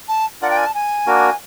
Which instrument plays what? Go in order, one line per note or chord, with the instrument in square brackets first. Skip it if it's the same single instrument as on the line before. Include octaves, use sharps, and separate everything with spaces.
[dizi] A5
[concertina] D4 F4 A#4 D5 [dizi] F#5
[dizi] G5
G#5
A5
G#5
[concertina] A#3 D4 F#4 A#4